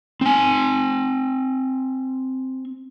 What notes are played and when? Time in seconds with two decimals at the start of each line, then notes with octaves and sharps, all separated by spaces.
0.21 C4 G#5